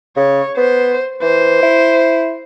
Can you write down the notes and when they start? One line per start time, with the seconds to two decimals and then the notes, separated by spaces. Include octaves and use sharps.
0.16 C#3 C#5
0.57 B3 C5
1.22 E3 C5
1.63 E4